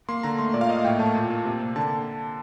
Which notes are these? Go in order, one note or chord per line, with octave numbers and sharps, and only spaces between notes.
A#3 C6
D3 A#5
A3 C6
A#2 D5
F5
A#3 D#5
A2 G5
A3 A5
A#2
A#3
C3
A#3
D3 A5